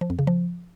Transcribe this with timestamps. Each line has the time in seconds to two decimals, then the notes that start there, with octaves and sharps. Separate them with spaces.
0.01 F3
0.10 F2
0.19 C#3
0.27 F3